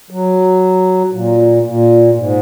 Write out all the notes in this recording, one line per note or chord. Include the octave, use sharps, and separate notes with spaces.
F#3
A#2
A#2
G#2